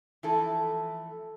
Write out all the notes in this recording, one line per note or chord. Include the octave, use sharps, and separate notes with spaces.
E3 F3 A3 E4 A4